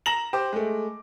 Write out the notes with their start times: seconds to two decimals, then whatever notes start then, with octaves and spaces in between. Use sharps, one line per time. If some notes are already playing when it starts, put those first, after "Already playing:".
0.06 A#5 A#6 E7 F#7
0.33 G4 C5 D6
0.52 G#3 A3